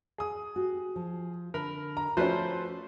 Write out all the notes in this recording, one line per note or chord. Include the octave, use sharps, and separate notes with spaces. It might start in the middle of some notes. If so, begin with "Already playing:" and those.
G#4 D#6
F#4 G4
F3
D3 A#4 B5
A#5
F3 A3 C#4 F#4 B4 C5